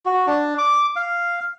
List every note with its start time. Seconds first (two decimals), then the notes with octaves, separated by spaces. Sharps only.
0.06 F#4
0.27 D4
0.58 D6
0.96 F5